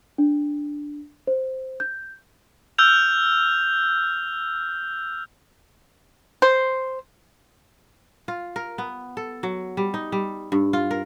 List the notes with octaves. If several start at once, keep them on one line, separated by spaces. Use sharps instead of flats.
D4
C5
G6
E6 F6 G6 F7
C5
F4
A#4
B3
A4
F#3
G3
D#4
G3
G2
F4
A#4